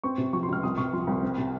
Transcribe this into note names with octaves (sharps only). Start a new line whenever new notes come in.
C4 C#6
C3
F3 C#6
C6
C#2 F6
C2 D#6
C3 C#6
F3 C6
C2
C4
C3